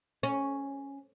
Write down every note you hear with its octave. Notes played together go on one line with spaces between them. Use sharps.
C#4